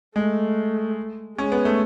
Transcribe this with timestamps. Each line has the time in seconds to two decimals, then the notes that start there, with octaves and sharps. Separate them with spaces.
0.16 G#3 A3
1.38 G#3 C#4
1.52 B3
1.65 A3